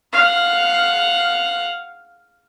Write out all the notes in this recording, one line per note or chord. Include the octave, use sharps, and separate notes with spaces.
F5 F#5